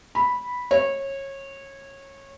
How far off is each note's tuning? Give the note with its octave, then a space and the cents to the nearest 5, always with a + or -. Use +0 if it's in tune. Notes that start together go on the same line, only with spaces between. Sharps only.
B5 -5
C#5 -20